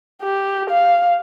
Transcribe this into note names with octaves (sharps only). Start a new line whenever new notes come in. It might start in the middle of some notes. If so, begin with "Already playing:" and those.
G4
F5